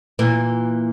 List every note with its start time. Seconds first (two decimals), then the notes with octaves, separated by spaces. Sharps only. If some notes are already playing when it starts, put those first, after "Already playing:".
0.19 A#2 E3